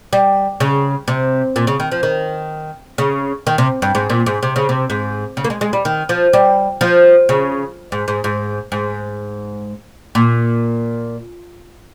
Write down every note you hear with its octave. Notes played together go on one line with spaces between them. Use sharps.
G3
C#3
C3
A#2
C#3
D#3
F3
D#3
C#3
D#3
C3
G2
G#2
A#2
G#2
C3
C#3
C3
G#2
C#3
A#3
G#3
G#3
G3
D#3
F3
G3
F3
C#3
G#2
G#2
G#2
G#2
A#2